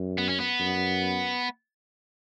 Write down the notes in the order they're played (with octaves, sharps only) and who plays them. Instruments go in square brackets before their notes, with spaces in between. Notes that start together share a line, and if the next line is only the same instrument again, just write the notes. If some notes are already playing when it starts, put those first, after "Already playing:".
Already playing: [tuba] F#2
[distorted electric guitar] B3
C#4
B3
[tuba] F#2